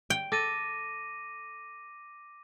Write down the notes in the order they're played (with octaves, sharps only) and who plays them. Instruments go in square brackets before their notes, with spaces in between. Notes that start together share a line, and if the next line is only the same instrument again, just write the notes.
[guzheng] G5
[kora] A4 [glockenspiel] D6 A#6 D#7